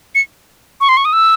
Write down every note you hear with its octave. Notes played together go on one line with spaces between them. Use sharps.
C#7
C#6
C6
C#6
D#6
E6